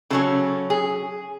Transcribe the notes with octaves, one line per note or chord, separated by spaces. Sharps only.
C#3 F#3 C#4 A4
G#4